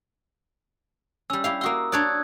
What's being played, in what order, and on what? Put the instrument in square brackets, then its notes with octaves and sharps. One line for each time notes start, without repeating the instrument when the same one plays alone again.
[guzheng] G3 C#4 [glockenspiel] E6
[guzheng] E4 G4 F5
[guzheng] A#3 F#4 C6 [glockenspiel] D#6 E6
[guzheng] D4 C#5 D5 [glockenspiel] D#6 F#6 G#6